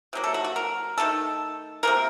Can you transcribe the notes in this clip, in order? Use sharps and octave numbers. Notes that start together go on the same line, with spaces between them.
C3 F#3 A#3
A4
F#4
F#4
A#4
D#3 F#3 A3 A4
C3 F3 A#3 A#4